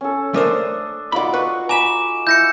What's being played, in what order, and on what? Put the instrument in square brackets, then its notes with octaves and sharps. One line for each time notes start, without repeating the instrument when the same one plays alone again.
[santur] C#4 A4
[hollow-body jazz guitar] A3 A#4 C5 [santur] D4 D#6
[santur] D#4 F4 F#4 [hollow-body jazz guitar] D5 B5
[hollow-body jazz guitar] B4 [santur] C#6
[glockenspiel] G#5 D6 E7 [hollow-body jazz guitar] A#5 B5
[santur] E4 B5 [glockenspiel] G6 A#6 C#7